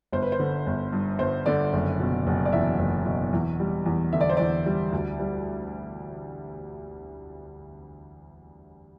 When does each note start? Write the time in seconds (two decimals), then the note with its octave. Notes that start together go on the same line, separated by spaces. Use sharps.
0.12 G1 C5
0.22 B4
0.32 C5
0.39 D3
0.67 G1
0.92 G2
1.19 G1 C5
1.46 D3 D5
1.73 F#1
2.00 B2
2.27 F#1
2.45 D5
2.52 E2 E5
2.79 F#1
3.06 B2
3.33 E2
3.60 G3
3.86 E2
4.13 D3 E5
4.21 D5
4.30 C5
4.37 E2 D5
4.66 G3
4.92 D2
5.20 G3